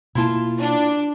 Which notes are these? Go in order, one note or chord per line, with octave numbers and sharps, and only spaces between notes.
B2 A#3 E4 F4 A5
D4